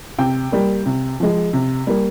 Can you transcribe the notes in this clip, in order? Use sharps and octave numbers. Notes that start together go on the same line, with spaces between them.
C3 G5
G3 A#3
C3
F3 G#3
C3
G3 A#3